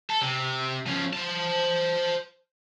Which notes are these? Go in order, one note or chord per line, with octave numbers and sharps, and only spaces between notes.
A4
C3
F3 C#4
C5 A5